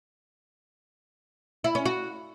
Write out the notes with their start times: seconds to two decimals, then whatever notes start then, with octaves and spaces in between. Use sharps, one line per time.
1.64 E4
1.75 C#4
1.85 F#4